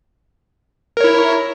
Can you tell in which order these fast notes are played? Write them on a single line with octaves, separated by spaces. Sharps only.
A#4 C#5 E4